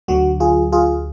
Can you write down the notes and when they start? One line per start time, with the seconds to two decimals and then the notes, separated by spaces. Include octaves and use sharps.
0.08 D2 D3 F#3 F#4
0.40 F4 G#4
0.72 F4 G#4